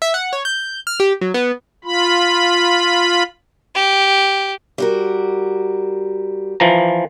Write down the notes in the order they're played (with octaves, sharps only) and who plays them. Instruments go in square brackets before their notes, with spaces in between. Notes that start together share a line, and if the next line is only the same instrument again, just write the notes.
[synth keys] E5
F#5
C#5
G6
F6
G4
F#3
B3
[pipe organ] F4 B5
[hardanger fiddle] G4
[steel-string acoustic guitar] G3 F#4 A#4
[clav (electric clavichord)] E3 F3 A#5